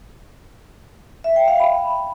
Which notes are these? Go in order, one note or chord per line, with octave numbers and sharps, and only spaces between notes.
E5
G5
F5
B5